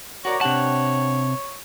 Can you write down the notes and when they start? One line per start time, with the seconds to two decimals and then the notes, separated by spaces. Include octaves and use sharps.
0.25 F#4 A#4 C#5 D5
0.41 C3 D4 G4 F#5 A5